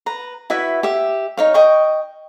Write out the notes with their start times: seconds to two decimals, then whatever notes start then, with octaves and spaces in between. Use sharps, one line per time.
0.06 B4 A#5
0.50 E4 F#4 B4 E5
0.83 G4 E5
1.37 D#4 C#5 F5
1.54 D#5 G5 C#6